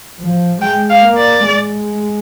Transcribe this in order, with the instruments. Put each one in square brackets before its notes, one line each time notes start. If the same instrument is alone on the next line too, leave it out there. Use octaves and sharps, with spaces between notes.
[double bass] F3
[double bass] G#3 [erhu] G5
[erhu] F5
[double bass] A#3
[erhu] D5
[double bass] G#3